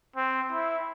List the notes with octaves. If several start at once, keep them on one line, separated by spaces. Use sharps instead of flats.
C4
E4